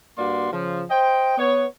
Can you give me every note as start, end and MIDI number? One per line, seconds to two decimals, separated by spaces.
0.18 0.52 43
0.18 0.52 58
0.18 0.52 66
0.18 0.52 74
0.18 0.52 84
0.53 0.84 49
0.53 0.84 53
0.91 1.37 72
0.91 1.37 75
0.91 1.37 79
1.38 1.65 59
1.38 1.65 73